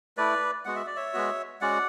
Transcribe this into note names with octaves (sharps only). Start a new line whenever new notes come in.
A3 E4 B4 D5
G#3 B3 F#4 F#5
E5
D5
C#5 E5
G#3 B3 F#4
G#3 C#4 F#4 D5 F#5